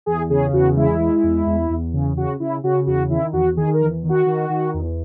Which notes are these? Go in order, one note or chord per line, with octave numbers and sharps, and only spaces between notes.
E2 G#4
C#3 G#4
E2 F#4
G#3 E4
G#3
E2
E2
E2
C#3
C#3 F#4
C#3 E4
C#3 F#4
E2 F#4
D#3 E4
E2 F#4
D#3 G#4
A#4
E2
D#3
F#4
D#3
D#3
E2